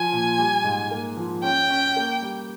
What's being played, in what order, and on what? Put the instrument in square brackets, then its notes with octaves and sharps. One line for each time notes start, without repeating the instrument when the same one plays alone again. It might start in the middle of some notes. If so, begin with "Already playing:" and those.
Already playing: [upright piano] F3 [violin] G#5
[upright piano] A#2
G3
G#2
A#3
F3
[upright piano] C#4 [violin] G5
[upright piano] C#4
A#3
G3